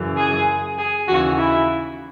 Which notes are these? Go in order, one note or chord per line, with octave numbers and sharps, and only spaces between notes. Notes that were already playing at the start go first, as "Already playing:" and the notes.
Already playing: F#2 C#3 E3
G#4
G#4
D#2 C#3 E3 F#4
E4